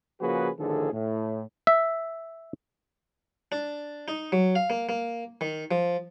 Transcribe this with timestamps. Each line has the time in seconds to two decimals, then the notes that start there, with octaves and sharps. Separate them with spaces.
0.21 C#3 F3 A#3 F#4 G#4 B4
0.59 A1 D3 D#3 F3 G#4 A4
0.93 A2
1.67 E5
3.52 D4
4.08 D#4
4.32 F#3
4.55 F5
4.70 A#3
4.89 A#3
5.41 D#3
5.71 F3